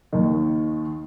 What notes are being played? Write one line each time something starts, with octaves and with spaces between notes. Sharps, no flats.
D#2 D#3